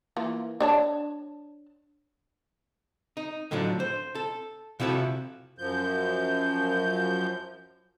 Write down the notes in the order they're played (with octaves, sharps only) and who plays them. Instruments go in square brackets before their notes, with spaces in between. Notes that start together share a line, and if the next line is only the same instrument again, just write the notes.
[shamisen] E3 A#3 F4
D4 C#5 A5
[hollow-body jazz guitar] D#4
A2 D3 F3 F#3 D4
C5
A4
C3 F3 E4 F#4 A4
[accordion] F#2 F3 G6